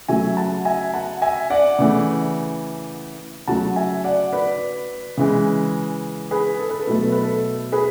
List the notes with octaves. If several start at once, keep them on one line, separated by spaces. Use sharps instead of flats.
C#3 F#3 A3 E5 G#5
F#5 A5
E5 G#5
F#5 A5
E5 G#5
D5 F#5
C#3 E3 A3
C#3 F#3 A3 F#5 A5
E5 G#5
D5 F#5
B4 D5
C#3 E3 G#3
G#4 B4
A4
B4
A4
B2 F#3 A3 B4
A4
B4
A4
G#4 B4